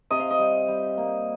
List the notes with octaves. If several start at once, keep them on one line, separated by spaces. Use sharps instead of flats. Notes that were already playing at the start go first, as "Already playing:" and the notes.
C3 D#5
F5
D#5
G3
G3
A#3